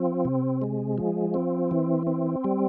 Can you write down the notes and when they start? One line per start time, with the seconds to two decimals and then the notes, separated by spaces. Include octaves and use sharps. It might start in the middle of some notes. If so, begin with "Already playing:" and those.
Already playing: F3 C4
0.25 C3
0.62 G#3
0.98 F3
1.34 C4
1.71 E3
2.07 C4
2.44 G3